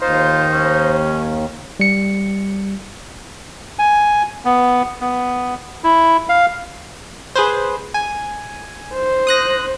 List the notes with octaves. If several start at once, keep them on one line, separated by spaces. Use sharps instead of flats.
D#2 D#4 F4 C5
C#4
G3 C#7
G#5
B3
B3
E4
F5
G#4 B4 C5
G#5
C5
D#6 F#6 A#6